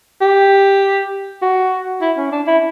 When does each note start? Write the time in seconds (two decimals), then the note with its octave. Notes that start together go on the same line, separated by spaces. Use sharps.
0.21 G4
1.42 F#4
2.02 E4
2.17 C#4
2.32 D4
2.47 E4